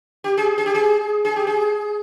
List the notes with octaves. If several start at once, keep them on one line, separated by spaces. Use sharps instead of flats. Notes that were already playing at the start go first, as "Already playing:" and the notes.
G4
G#4
G#4
G4
G#4
G#4
G4
G#4